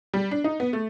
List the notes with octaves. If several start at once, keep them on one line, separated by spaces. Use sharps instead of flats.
G3
D4
D#4
B3
A3